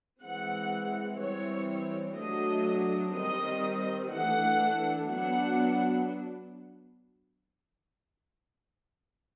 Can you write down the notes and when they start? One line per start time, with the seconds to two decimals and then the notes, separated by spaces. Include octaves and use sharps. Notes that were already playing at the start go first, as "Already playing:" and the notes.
0.21 E3 G#3 C4 F#5
1.18 E3 G3 C4 C#5
2.16 F#3 A3 D4 D#5
3.14 D#3 G3 C4 D#5
4.11 E3 A3 D4 F#5
5.09 F#3 B3 D4 F#5